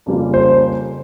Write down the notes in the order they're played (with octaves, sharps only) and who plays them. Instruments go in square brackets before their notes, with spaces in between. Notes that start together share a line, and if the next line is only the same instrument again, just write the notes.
[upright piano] F2 C#3 G3 A#3 F4
[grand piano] C5